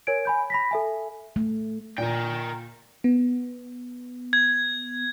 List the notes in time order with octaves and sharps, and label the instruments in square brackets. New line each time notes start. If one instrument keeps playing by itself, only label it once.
[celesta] A#4 C#5 G#5 G#6 D7
G#5 B5 G6
B5 A#6 B6
A4 E5 G#5
[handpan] A3
[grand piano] A#2 [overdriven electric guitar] A#4 G5
[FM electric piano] B3
[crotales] G#6